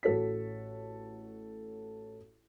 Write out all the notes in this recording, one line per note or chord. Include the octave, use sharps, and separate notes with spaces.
A1 F#4 A4 C#5 B6